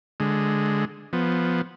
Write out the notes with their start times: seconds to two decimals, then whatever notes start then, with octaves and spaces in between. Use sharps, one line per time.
0.20 D3 G#3
1.13 F3 B3